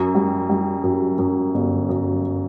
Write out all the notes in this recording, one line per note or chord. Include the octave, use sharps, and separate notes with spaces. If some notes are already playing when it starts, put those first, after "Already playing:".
Already playing: F#2
G3
G3
F#2
F#2
G1
F#2